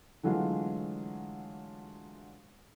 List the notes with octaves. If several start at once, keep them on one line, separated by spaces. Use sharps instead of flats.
D3 E3 F#3 G#3 A3 F4